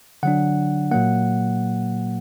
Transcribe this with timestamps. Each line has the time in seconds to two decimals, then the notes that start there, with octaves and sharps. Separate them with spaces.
0.23 D3 F#3 D4 F#5
0.91 A#2 F#3 A#3 F#5